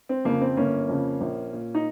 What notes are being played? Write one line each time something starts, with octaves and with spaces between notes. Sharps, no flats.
C4
F2 C#3 A#3
C4
G1 A#3 C#4
F2 C#3
A#1
A#2
D#4